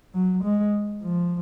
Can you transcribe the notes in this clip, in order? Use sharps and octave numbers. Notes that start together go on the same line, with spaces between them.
F#3
G#3
F3